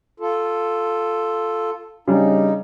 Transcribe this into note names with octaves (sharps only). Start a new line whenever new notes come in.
F4 A4
C#3 G3 D4 D#4